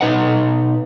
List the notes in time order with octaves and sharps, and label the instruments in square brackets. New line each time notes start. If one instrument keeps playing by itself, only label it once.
[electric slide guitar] B2 F#3 D#4 B4 D#5 F#5